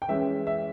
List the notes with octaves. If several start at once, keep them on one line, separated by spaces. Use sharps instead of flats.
G5
E3 G#3 C#4 E5
E5